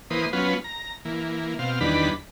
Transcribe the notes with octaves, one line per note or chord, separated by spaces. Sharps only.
E3 A#3 B4 C5 D#6
F#3 B3 C#4 F4 B4
A#5
E3 A#3
B2 C4 F5
E2 D#3 G3 D4 B4 B5